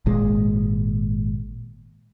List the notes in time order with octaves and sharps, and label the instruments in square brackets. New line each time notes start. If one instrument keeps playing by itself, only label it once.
[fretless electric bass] G#1 A#2 G#3